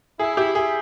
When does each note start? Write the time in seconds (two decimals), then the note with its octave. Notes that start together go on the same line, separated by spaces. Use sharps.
0.19 E4 G#4
0.37 E4 G4
0.55 E4 G#4